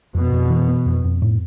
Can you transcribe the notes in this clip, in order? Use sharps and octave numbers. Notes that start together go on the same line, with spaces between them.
F2 B2
F2
E3
B3
F2
F2
A2